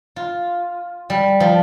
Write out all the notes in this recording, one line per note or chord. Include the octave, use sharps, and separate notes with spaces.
F4
G3
F3